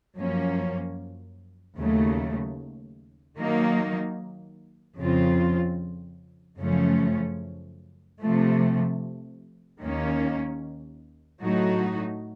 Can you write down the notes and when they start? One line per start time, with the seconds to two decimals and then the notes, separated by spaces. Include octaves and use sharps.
0.17 F#2 F3 A#3 C#4
1.78 D#2 C#3 F#3 A3
3.38 D#3 F#3 A#3 D#4
4.99 F2 C#3 F3 C4 F4
6.59 F#2 C#3 F3 A3 C#4
8.21 C3 F3 A3
9.81 D#2 D#3 A#3 C#4
11.42 A2 F#3 A3 D#4 F#4